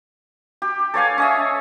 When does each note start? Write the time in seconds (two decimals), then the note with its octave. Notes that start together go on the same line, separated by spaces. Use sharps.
0.62 G4
0.94 A4 C#5 F5 G#5
1.18 C#4 D#5 E5